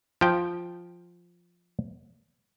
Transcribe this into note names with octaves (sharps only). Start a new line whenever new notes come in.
F3 G5